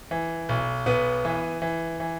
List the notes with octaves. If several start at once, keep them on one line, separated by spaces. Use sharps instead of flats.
E3
B1
B1 B3
E3
E3
E3